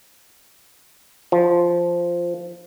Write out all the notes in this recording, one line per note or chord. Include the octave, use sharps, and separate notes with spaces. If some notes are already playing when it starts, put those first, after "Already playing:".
F3